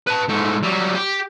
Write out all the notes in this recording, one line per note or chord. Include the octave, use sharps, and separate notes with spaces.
B4 A5
G#2 A3
F#3 G3
G4